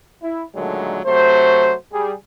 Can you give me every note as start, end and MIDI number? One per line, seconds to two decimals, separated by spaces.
0.23 0.44 64
0.55 1.00 46
0.55 1.00 50
0.55 1.00 51
0.55 1.00 54
0.55 1.00 56
0.55 1.00 57
1.05 1.73 48
1.05 1.73 54
1.05 1.73 57
1.05 1.73 72
1.93 2.13 55
1.93 2.13 68